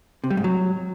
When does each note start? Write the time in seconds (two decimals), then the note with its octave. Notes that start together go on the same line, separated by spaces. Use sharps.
0.24 C3
0.30 G3
0.37 G#2
0.44 F#3